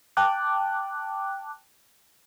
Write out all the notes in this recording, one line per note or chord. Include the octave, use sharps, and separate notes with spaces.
G5 A5 D6 F#6